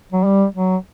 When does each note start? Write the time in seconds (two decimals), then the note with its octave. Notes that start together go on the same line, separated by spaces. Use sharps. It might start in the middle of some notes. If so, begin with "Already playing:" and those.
0.13 F#3
0.24 G3
0.55 F#3